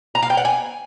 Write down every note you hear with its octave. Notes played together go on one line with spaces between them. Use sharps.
A#5
F5
G5
F#5
G#5